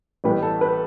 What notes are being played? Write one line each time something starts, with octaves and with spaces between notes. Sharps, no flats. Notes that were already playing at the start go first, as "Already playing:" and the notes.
A1 A2 G3 B3 B4
A4
B4